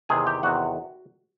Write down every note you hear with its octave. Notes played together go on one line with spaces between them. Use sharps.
E2 C3 D#3 G#4 G#5
G4 G5
E2 C3 D#3 F#4 F#5